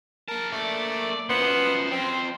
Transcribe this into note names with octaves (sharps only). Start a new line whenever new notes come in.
A#3 A#4 A5
A3 D5
F#2 F3 B3 C5
F2 C4